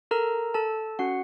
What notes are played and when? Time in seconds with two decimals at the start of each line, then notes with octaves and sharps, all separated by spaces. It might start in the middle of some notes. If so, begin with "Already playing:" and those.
0.11 A4 A#4 A#5
0.54 A4 A5
0.99 C#4 F#4 F#5